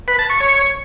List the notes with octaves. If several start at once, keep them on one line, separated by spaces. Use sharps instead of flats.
B4
A5
C#6
C#5